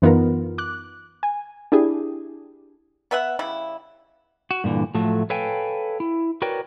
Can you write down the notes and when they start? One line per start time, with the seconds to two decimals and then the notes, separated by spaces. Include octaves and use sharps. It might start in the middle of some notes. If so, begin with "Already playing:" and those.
0.02 F#2 E3 B3 D#4 F4 A#4
0.58 D6 F#6
1.23 G#5
1.72 D4 E4 G4 G#4
3.11 B3 B4 E5 F#5
3.39 C#3 G3 E4
4.51 F#4
4.64 G2 A#2 D3 E3
4.94 A2 F3 F#3 A3
5.30 A4 B4 C#5 F5 G5 G#5
6.00 E4
6.42 F#4 A#4 B4 C#5 D5 G5